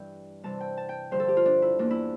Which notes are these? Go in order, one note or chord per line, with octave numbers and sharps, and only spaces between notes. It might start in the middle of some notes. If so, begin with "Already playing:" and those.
Already playing: G2 E3 G5
C3 E3 G3 A5
G5
A5
G5
G2 D3 F3 C5
A4
G4
F4
D4
E4
E2 E3 A#3 D4
E4